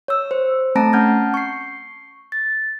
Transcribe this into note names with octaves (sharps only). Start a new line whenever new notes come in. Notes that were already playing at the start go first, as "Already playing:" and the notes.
C#5 E6
C5
A3 C4 A5 A#5 A#6 D7
C#4 F#5 A5 F6 G6 G#6
C#6 C7
A6